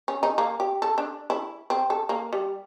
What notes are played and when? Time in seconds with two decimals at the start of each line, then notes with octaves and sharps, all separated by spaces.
0.08 C#4
0.23 D#4
0.38 A#3
0.60 G4
0.82 A4
0.98 D4
1.30 E4
1.70 C4
1.90 A4
2.09 A#3
2.33 G3